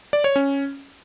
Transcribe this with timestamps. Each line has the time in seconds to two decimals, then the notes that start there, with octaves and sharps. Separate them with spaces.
0.13 D5
0.24 C#5
0.36 C#4